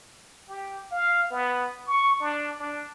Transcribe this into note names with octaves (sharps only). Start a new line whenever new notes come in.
G4
F5
B3
C#6
D4
D4